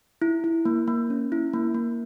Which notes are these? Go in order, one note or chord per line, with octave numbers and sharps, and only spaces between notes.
E4
E4
A#3
A#3
C#4
E4
A#3
A#3